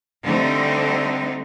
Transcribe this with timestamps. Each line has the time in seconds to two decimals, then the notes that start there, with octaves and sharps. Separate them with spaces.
0.23 D3 G3 A3 C4 D#4